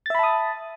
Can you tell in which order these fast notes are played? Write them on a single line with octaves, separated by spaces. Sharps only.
A6 E5 B5 A5 D#6